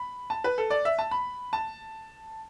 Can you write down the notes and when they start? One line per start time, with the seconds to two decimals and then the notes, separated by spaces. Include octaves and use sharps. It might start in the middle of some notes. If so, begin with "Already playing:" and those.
Already playing: B5
0.30 A5
0.44 B4
0.58 A4
0.70 D5
0.85 E5
0.99 A5
1.11 B5
1.53 A5